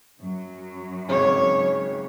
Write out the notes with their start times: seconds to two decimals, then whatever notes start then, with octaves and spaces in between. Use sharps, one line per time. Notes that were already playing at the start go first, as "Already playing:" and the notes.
0.19 F#2 F#3
1.09 G#1 C#3 C#4 C#5